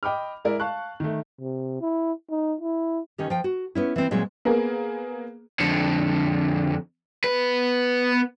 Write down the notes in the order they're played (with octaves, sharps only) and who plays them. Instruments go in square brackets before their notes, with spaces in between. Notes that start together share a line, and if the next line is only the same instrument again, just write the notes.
[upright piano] D#5 G5 B5 D6 F6
G#3 E4 A#4 D5 E5
F5 A5 C#6 F#6
D#3 A3
[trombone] C3
E4
D#4
E4
[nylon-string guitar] D#3 C#4 G4
F3 G5
F#4
B3 C#4 E4
E3 C4
A#2 F#3 G#3 C4
[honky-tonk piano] A#3 B3 G#4 A#4
[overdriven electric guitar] F2 D3
B3 B4